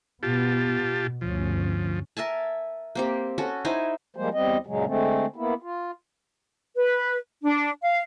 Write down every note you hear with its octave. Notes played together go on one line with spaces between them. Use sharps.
B2 B3 F4 G4 A5
B2
G1 D2 F3 C#4
A#4 E5 G#5 A5
A#3 C4 G4
C#4 F#4 A4
D#4 E4 C5 G#5
F3 G3 G#3 A#3 C5
E2 G3 C4 D#5
F#2 A#2 C#3 F#3 G#3
D3 G#3 A3 C4
A#3 B3 E4
F4
B4
D4
F5